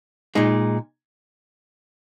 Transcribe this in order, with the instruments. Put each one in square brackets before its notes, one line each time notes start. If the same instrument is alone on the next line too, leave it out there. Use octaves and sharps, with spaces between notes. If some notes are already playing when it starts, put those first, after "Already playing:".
[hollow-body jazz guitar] A#2 G#3 D#4